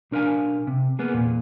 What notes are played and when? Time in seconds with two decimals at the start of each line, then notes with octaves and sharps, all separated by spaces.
0.11 B1 D4 A#4 F5 G#5
0.67 C3
0.99 A#3 B3 G#4
1.13 E2 A#2